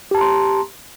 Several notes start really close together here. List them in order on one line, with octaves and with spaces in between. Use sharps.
G4 A5 A#5 C6